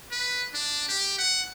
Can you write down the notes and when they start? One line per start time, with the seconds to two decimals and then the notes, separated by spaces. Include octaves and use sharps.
0.12 B4
0.54 D4
0.89 G4
1.18 F#5